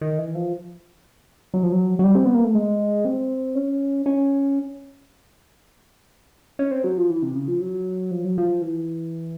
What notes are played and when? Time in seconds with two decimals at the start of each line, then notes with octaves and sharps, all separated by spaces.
0.01 D#3
0.18 E3
0.35 F3
1.54 F#3
1.63 F3
1.72 F#3
1.99 F#3
2.04 G3
2.15 C4
2.25 B3
2.34 A#3
2.45 A3
2.55 G#3
3.05 C4
3.55 C#4
4.06 C#4
6.59 C#4
6.71 C4
6.84 F#3
6.98 F3
7.10 E3
7.23 C3
7.35 C#3
7.48 F3
7.61 F#3
8.11 F3
8.25 F#3
8.38 F3
8.62 E3